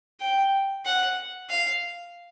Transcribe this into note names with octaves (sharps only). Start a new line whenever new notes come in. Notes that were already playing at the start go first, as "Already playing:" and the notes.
G5
F#5
F5